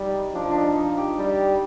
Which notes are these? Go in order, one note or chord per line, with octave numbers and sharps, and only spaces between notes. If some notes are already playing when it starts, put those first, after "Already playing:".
Already playing: G3 D#4
F3 D4
D4
D#4
D#4
G4
G3